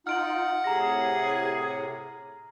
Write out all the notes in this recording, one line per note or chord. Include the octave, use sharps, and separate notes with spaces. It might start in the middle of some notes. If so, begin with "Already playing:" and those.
D#4 F4 F#5 F6 D7 F#7
A2 C3 G#4 A#5 A#6